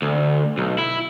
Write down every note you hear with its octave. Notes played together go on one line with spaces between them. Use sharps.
D2
B1
E4